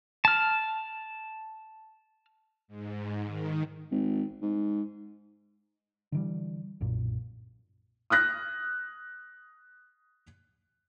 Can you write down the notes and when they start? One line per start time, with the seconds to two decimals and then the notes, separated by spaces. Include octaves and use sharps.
0.25 A5 F6
2.68 G#2
3.25 D#3
3.91 G#1
4.42 G#2
6.12 D3 E3 G3
6.81 B1 F#2 A#2
8.10 D#6 F6 F#6 A#6